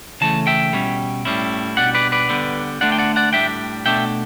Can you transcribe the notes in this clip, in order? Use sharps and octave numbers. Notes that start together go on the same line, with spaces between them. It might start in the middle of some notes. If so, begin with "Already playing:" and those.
C#3 E3 A3 A5
E5 G5
B2 G3 C#4
A2 G3 C#4 E4
B2 G3 D4 D5 F#5
B4 D5
B4 D5
D3 G3 B3
D3 A3 D4 D5 F#5
G5
D5 F#5
D5 F#5
A2 G3 D4 E5 G5
B2 A3 D4 E5 G5